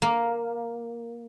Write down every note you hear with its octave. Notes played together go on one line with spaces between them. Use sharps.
A#3